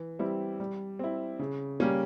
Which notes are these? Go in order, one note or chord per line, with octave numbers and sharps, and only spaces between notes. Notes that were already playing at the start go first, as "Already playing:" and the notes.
Already playing: E3
G3 C4 E4
G3
C4 E4
C#3
G3 A#3 C#4